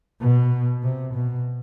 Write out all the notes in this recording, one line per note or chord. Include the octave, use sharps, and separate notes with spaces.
B2
C3
B2